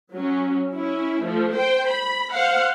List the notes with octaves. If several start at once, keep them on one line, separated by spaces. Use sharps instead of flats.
F#3 C#4
C#4 E4
F3 A3
C5 G5
B5
C5 F5 F#5